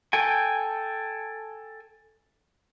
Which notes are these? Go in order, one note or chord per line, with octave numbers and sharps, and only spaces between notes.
A4 G5 G#5